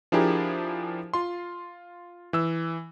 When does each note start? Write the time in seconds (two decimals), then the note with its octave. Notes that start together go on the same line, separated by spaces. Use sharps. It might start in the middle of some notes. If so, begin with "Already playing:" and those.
0.12 F3 D4 E4 G4 G#4 A#4
1.14 F4 C6
2.33 E3 E6